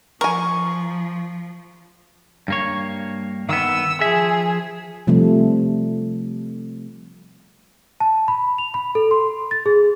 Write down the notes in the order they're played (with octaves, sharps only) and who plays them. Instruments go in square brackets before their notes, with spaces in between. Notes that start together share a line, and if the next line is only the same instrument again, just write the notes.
[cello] F3 [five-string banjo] A#4 G#5 [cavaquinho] C#6
[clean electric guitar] G2 A#3 C#5
[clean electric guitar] D#3 B3 [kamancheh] E6
[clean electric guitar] F3 E5 [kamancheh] G#4
[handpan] C3 F3 G3 A3
[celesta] A5
B5
F7
B5
A4
C6
A6
G#4